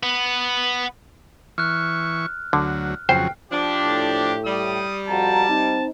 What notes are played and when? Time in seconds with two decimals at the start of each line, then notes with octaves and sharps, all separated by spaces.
0.03 B3
1.58 E3 C#6 F6 F#6
2.53 D2 D3 F#3
3.09 F2 C#3 F#3 C5 G5 C7
3.51 F3 D4 G4
3.81 A2
4.46 G3 D#6
5.09 F2 F#4 A5 A#5
5.49 C4 D#4